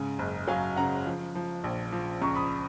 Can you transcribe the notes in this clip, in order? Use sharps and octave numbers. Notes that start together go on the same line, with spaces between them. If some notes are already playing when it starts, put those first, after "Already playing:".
Already playing: G#2 C#3 G#5
F#1
F#3 F5 G#5
C#3 F#5 A#5
F3
F3
A#1
F3
C#2 A#5 C#6
B5 D#6